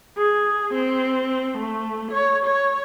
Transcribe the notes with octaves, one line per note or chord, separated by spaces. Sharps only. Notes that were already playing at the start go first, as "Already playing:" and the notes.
G#4
C4
A3
C#5
C#5